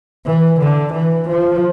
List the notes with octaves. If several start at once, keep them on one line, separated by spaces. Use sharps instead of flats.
E3
D3
E3
F3